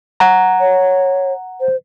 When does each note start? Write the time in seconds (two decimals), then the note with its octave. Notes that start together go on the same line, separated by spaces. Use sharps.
0.20 F#5 A#5
0.60 C#5
1.60 C5